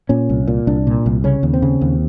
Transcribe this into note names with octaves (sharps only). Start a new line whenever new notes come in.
A#2 C#4
C2
A#2
C2 D4
A#2
C2
C#3 C#4
D#2
C4
C#3
D#2